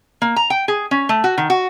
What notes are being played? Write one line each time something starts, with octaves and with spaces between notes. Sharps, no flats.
A#3
A#5
G5
G#4
C#4
A3
F#4
D#3
F#4